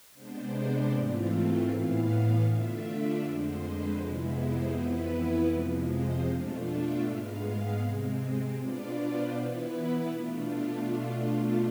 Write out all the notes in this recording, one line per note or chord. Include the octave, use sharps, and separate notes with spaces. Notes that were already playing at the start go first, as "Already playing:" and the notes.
C3 G#3 B3 D4 C5
D5
G#2 E3 A3 C4 F4
A2 E3 B3 F5
D3 A3 D4 F4 E5
D5
F2 D3 G#3 C5
B4
F2 C3 G#3 B3 E4
C5
F2 E3 B3 E4 B4
B4
F2 C3 F3 G#3
C5
B2 A3 D4 F4
E5
G#2 G#3 B3 F5
F5
C3 G#3 C4
B2 B3 D4 F4 D5
C5
E3 B3 E4 B4
B2 A3 D4 F4